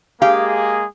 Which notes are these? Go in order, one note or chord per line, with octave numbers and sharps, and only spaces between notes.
G#3 A#3 G4 G#4 F5